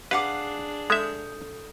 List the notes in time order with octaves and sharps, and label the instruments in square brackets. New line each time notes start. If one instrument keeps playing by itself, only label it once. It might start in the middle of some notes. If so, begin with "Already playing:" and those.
[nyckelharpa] D4 G#4 [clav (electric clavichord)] B4 [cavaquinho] F5 F#5 D6
[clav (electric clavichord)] G#3 E5 [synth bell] A4 D#6 G6